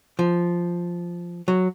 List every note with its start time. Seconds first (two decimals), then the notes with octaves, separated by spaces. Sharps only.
0.19 F3
1.48 F#3